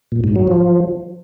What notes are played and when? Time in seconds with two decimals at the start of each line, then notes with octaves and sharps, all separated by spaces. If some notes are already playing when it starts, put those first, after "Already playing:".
0.12 A#2
0.24 G#2
0.36 F#3
0.48 F3